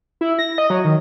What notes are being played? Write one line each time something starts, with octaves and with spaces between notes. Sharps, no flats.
E4
A#6
D#5
F#3
D#3